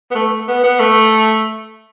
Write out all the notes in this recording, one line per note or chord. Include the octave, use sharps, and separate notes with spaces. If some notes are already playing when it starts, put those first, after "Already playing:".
B3
A3
B3
B3
A3